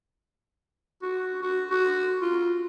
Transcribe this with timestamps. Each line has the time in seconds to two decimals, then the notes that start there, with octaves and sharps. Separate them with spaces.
1.02 F#4
1.43 F#4
1.70 F#4
2.22 F4